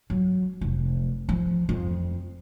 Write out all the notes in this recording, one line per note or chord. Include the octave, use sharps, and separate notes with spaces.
F#3
F1
F3
F2